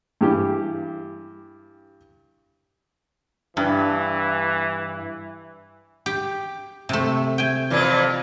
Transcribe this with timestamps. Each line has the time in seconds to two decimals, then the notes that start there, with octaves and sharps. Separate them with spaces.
0.21 G2 E3 G4
3.57 G2 E3
6.06 G4
6.89 C3 A3
7.38 G5 G#5
7.70 F2 A#2 E3